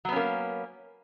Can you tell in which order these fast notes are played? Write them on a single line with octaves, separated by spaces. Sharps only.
F#3 B3 C#4 A#3